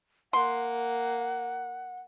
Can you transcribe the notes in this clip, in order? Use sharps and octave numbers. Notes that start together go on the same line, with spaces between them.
A#3 F#5 C6